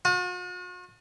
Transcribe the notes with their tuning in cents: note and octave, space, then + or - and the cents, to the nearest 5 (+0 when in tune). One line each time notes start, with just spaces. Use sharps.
F#4 -45